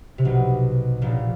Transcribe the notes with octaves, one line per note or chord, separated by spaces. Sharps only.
C3
B1 B2
A#1 A#2